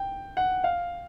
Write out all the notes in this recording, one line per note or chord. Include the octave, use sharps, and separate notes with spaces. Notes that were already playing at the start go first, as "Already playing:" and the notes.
Already playing: G5
F#5
F5